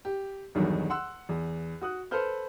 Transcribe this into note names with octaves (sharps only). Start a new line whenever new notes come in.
G4
B1 E2 G2 D#3 F#3
F#5 C6 E6 F#6
E2
F#4 D#6 F#6
A4 B4 C5 F6 G6